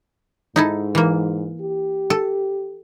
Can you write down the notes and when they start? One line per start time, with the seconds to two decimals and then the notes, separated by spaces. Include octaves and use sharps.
0.56 G#2 D#4 E4 A4
0.95 E3 A#3
1.61 G4
2.10 A4